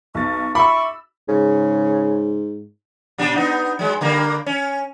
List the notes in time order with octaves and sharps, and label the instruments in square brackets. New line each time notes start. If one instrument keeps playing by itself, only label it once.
[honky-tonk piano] B1 A6 [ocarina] C#6
[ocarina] E5 [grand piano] B5 [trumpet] C#6 [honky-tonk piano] D6 E6
[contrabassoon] G#2 [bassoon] C#3
[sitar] A#2 G3 D4
B3 D#4
F#3 G#3
D3 G3 A#3
C#4